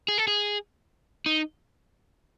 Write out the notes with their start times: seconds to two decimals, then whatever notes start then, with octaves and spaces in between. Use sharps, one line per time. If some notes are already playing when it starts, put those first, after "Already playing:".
0.08 G#4
0.18 A4
0.27 G#4
1.26 D#4